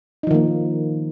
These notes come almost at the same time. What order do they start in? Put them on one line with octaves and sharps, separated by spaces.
D#4 F3 D#3 A#3